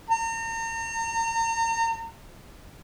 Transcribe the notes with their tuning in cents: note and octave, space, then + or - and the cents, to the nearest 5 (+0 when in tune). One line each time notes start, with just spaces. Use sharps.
A#5 -40